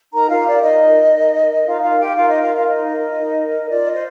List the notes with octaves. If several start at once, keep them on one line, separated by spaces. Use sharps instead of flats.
D#4 A#4 A#5
F4 F5
G4 A#4
D5
D#4 D#5
A#4
D#4
A#4
D#4 F4 F5
F4 F5
A#4
G4 G5
D#4 F4 F5
D#5
F4 A#4 F5
F4 F5
D#4 D#5
A#4
D#4
A#4
F4 D5
D#5
C5